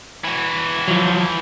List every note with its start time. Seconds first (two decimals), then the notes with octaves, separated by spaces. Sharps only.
0.24 E3 F#4
0.88 F3 F#3